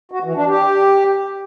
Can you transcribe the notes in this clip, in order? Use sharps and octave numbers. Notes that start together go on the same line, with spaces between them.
F#4
E3
D4
G4